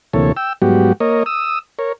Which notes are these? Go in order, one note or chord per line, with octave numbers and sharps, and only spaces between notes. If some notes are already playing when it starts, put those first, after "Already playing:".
D2 C3 E3 A#3 A4 C#5
G5 E6
G#2 F#3 G3 B3 F#4 G4
A#3 A#4 C#5 D#5
D#6 E6
A#4 C#5